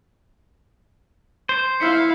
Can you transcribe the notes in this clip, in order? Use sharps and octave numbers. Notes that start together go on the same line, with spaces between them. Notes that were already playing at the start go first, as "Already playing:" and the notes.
C5 C7
E4 F5 E6 B6 C#7